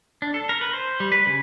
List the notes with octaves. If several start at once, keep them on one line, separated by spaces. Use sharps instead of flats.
D4
A4
A#4
B4
C5
G3
B4
C#3